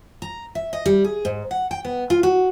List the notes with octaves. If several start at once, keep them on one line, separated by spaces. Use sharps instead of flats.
A#5
E5
D#5
G3
G#4
G#2
F#5
G5
B3
F4
F#4